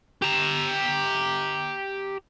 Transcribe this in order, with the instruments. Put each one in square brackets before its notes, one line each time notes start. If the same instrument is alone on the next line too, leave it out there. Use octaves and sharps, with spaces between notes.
[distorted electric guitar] G4 A#5